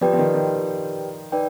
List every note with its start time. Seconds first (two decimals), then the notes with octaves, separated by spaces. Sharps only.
0.01 F3 G4 B4 D5 G5
0.13 F3
0.19 D#3
0.34 D#3
1.32 D#4 B4 D5 G5